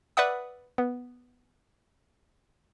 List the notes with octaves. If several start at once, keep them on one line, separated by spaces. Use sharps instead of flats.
B4 D5 E5 F#5 D#6
B3